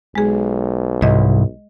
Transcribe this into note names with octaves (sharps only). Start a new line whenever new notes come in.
B1 G#3 G#4
C2 G#2 D#5